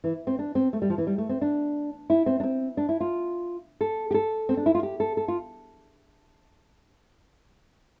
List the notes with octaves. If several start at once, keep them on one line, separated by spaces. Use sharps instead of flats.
E3
C4
D4
C4
A3
G3
F3
E3
G3
A3
C4
D4
E4
C4
D4
C4
D4
E4
F4
A4
G4
A4
C4
D4
E4
F4
G4
A4
A4
F4